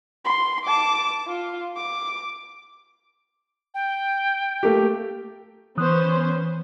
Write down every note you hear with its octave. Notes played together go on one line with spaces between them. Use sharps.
C6
A5 D6
F4
D6
G5
A3 A#3 G4
E3 B3 C#4 C5 D#6 F#6